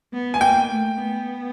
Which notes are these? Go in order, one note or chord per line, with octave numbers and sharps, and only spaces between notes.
B3
G#5
A#3 G5
A3
B3